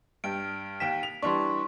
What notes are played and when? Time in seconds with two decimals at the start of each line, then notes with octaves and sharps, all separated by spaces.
0.24 G2 G5 F6 D7
0.80 D#2 G5 B6 E7
1.03 F7
1.22 E3 G3 D4 C6 C#6